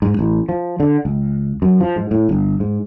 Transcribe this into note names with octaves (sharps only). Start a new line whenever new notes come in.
G#2
A1
F3
D3
C#2
F#2
F3
G#2
A2
G1
G#2